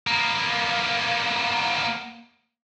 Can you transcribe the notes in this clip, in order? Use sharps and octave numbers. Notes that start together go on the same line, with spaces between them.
A#3 B3